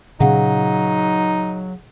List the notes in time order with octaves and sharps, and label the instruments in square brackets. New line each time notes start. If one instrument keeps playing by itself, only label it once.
[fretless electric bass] A#2 C#3 C#4 [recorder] F#3 [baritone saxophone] D#4 [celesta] G#4 F5 F#5